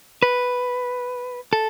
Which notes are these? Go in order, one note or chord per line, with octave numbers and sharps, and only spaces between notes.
B4
A4